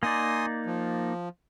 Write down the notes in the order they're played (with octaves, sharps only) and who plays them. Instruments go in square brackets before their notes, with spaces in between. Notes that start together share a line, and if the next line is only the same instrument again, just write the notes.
[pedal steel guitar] A#3 D#4 D5 [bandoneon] G#5 C6 D#6
[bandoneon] F3